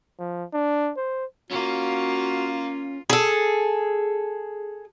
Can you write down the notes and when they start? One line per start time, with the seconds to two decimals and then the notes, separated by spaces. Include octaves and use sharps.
0.19 F3
0.53 D4
0.97 C5
1.51 A#3 C#4 F4 F#4
3.10 G#4 A4